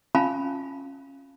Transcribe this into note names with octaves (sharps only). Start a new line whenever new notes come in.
C#4 F4 F5 G#5 A5 B5